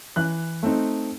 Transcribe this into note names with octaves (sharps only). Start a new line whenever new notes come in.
E3 F#6
A3 C4 D#4